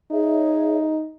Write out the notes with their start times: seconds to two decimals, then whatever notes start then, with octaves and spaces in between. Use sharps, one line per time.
0.11 D#4 G#4 C#5 E5